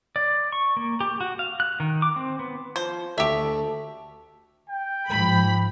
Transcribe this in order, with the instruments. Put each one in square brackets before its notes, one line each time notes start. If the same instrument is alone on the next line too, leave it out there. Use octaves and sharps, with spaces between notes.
[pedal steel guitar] D5
C#6
A#3
G4
F#4
F5
F#6
D#3
D6
C4
B3
[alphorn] F3 [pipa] C5
[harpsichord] D2 C#6 [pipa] G4 E5 [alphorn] A4
[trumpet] G5
[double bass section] G#2 F3 [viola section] B5